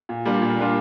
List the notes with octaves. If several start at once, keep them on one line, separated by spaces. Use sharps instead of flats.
A#2
G3 A#3 D4 F4
A#2
G3 A#3 D4 F4